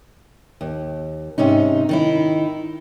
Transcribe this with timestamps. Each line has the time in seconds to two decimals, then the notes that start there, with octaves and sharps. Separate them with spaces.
0.61 D#2
1.38 G#2 C3 C#4 D#4
1.89 D#3 D#4 E4